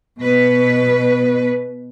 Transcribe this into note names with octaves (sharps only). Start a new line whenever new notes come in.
B2 B4